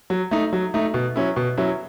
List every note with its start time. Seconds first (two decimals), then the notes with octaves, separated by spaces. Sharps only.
0.10 F#3
0.31 A3 D#4
0.53 F#3
0.74 A3 D#4
0.94 B2
1.16 F#3 C#4 E4
1.36 B2
1.57 F#3 C#4 E4